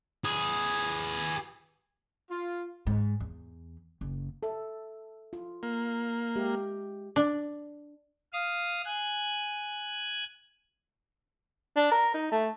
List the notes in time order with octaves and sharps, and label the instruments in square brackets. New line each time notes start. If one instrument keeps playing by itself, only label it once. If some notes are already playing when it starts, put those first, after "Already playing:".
[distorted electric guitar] G#4 B4
[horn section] F4
[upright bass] G#2
E2
F#1
[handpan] A4 E5
F4
[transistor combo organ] A#3
[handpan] G#3 G4 E5
[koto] D4
[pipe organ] F5 D#6
G#5 F#6
[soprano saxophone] D4
A#4
D#4
A3